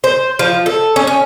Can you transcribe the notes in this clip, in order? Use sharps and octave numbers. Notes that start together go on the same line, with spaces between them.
C5
F3
A4
C#4
C#4